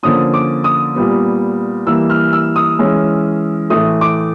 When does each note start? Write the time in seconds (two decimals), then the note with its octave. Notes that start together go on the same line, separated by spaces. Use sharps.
0.03 D3 F3 A#3 C#4 D#6
0.34 D6
0.64 D#6
0.95 A#2 G3 B3
1.87 E3 G3 A#3 E6
2.10 F6
2.33 E6
2.56 D#6
2.79 E3 G#3 C#4
3.70 A2 E3 A3 D#6
4.01 D6